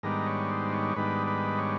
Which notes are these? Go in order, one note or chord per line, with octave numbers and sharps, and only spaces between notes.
G#2 D#3 G3 B3 D4 A#4
C#5
C5
C#5
G#2 D#3 G3 B3 D4 B4
B4
C#5